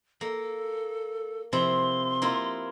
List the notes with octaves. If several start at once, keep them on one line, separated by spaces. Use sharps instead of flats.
A#3 A4
C3 F3 E4 C6
A#3 E4 F4